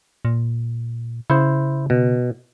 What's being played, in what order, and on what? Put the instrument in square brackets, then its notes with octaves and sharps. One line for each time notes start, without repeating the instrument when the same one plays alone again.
[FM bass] A#2
[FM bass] C#3 [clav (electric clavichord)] E4 C5
[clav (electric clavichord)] B2